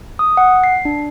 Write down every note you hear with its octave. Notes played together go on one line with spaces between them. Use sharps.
D#6
F#5
C7
D4